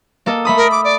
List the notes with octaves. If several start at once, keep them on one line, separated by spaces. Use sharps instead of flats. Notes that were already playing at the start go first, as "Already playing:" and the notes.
A#3 A4 D#5
A3 B5 D#6
A#4
D6
D5